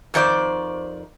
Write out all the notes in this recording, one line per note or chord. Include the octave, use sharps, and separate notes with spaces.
F2 D#3 C5 D5